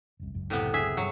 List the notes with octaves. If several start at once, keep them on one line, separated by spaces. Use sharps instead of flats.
F1 C2
F#1 C#2 F#2
A2 C3 B3
G#4 E5
G2 F3 F#3